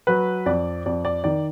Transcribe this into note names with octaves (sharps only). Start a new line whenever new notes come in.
F#3 B4
F2 D5
F2 D5
D5
D#3 D5